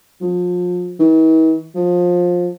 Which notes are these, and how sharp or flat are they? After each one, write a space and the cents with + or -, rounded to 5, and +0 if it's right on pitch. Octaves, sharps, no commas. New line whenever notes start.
F3 +35
E3 -45
F3 +20